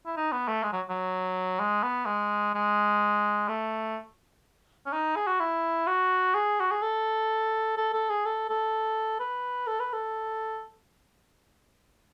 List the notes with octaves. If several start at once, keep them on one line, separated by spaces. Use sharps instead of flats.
E4
D#4
B3
A3
G#3
F#3
F#3
G#3
B3
G#3
G#3
A3
C#4
D#4
G#4
F#4
E4
F#4
G#4
F#4
G#4
A4
A4
A4
G#4
A4
A4
B4
A4
B4
A4